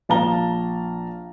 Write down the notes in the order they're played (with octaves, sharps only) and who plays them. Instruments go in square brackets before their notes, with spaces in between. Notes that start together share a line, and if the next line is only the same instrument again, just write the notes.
[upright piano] A#1 F5 A5 A#5 G7